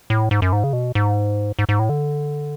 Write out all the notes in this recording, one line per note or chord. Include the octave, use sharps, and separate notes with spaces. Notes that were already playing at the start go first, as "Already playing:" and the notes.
A2
G#2
F#2
G#2
C#3
B2
G#2
G#2
G#2
A2
D3